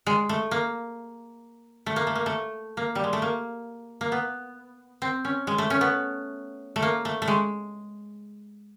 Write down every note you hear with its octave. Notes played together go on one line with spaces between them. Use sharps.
G#3
A3
A#3
A3
A#3
A3
A#3
A3
A#3
G3
G#3
A3
A#3
A#3
B3
C4
C#4
G#3
A3
C#4
B3
A3
A#3
A3
A3
G#3